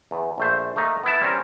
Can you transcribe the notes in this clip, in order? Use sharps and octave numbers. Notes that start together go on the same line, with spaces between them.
E2
A#1 A3 C5
A3 A#3 D#4
B3 E4 A5
G3 C4 C#4 A#4